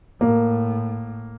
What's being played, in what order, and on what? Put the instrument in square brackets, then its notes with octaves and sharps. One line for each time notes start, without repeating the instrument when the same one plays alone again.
[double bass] A2 [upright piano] A#3